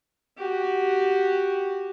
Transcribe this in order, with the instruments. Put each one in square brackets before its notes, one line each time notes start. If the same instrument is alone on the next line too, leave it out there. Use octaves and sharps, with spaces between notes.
[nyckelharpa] F#4 G4